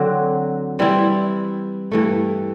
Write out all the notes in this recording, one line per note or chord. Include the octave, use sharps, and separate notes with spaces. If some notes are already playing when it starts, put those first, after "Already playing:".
Already playing: D3 F#3 C4 F#4
E3 G3 C4 E4
G2 E3 A3